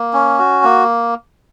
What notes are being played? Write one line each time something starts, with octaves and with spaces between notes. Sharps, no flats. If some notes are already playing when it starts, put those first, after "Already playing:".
Already playing: A#3
C#4
F#4
A#3